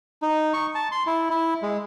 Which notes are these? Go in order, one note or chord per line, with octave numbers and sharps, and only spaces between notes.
D#4
C#6
A5
C6
E4
E4
G#3